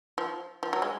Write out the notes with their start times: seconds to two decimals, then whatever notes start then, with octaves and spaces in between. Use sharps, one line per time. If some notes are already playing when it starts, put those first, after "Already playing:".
0.18 F3
0.63 F3
0.73 F#3
0.82 G#3